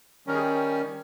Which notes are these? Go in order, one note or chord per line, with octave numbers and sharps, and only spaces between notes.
D#3 G3 C#4 A#4
G#4